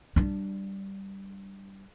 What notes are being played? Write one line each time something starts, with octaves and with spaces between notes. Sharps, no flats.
G3 D4